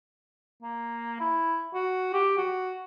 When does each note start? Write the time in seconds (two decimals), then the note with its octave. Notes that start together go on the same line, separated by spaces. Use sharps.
0.63 A#3
1.20 E4
1.74 F#4
2.13 G4
2.38 F#4